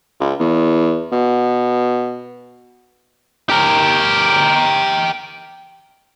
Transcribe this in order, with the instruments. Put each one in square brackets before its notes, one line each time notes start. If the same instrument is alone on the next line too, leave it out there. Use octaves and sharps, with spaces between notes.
[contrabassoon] C#2
E2
B2
[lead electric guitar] G4 A#4